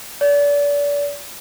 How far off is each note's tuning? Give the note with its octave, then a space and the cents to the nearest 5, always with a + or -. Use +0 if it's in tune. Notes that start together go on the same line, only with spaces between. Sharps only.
D5 -35